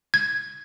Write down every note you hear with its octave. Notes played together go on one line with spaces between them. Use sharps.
G#6